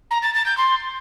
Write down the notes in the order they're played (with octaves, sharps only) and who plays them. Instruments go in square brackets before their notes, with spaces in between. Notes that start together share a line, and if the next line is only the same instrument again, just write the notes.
[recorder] A#5
A6
A6
G6
C6